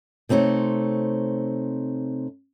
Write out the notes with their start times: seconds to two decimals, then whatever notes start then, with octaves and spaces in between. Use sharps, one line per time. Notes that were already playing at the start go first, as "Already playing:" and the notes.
0.29 C3 A3 C4 D#4 C#5